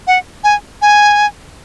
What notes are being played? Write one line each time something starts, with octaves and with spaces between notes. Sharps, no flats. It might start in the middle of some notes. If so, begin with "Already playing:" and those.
F#5
G#5
G#5